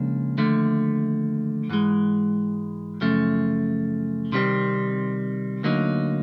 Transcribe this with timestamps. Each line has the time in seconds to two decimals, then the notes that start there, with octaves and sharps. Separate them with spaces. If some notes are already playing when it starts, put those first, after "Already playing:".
Already playing: C#2 C#3 F3 A#3 D4
0.38 D#2 D3 F3 A3
1.69 G#2 E3 G#3
3.01 F#2 C#3 F3 A3
4.32 C3 D#3 G3 C4 D#4
5.63 D2 D3 F#3 A#3 D#4